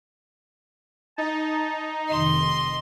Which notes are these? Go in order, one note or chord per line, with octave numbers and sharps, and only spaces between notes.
D#4 A5
F1 D#3 D#5 C6